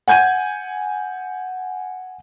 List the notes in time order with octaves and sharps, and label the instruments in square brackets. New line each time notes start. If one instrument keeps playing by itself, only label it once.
[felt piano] F#5 G#5 G6 G#6 D#7